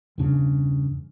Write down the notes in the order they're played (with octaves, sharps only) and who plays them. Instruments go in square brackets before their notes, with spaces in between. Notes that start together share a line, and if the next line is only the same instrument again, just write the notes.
[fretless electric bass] E2 G2 C#3 D4